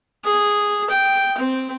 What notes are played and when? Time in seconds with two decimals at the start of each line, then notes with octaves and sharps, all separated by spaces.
0.24 G#4
0.90 G5
1.38 C4